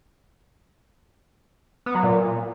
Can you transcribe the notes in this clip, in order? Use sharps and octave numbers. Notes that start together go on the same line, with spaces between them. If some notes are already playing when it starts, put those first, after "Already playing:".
B3
F#3
A#2